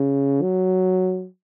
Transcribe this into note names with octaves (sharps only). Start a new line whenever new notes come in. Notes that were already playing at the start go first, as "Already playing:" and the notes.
Already playing: C#3
F#3